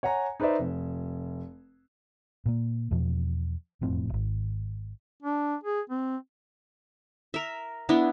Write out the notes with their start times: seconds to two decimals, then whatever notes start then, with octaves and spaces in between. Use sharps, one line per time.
0.03 C#5 F#5 G#5 A#5
0.40 D#4 B4 C5 D5 E5
0.59 F1
2.46 A#2 A#3
2.91 E2 B2 F3
3.81 E1 F2 A2 C4
4.09 D#1 G#1
5.23 D4
5.63 G#4
5.90 C4
7.34 A#4 E5
7.89 B3 D4 E4